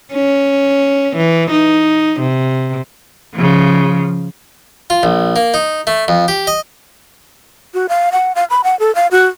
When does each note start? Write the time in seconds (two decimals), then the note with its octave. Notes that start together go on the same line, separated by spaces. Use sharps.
0.13 C#4
1.16 E3
1.51 D#4
2.20 C3
3.34 C#3 F3
4.90 F4
5.03 A#1
5.36 A#3
5.54 D#4
5.87 A3
6.08 F2
6.28 G4
6.47 D#5
7.74 F#4
7.89 F5
8.12 F#5
8.35 F5
8.50 B5
8.64 F#5
8.79 A4
8.95 F5
9.12 F#4